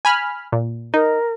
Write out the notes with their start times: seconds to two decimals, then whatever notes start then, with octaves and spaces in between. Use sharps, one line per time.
0.05 G#5 B5 F6
0.52 A#2
0.94 D#4 A#4